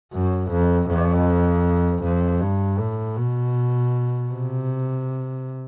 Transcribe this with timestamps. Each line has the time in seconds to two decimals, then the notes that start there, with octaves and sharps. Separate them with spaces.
0.13 F#2
0.52 F2
0.90 F2
2.03 F2
2.41 G2
2.79 A2
3.16 B2
4.30 C3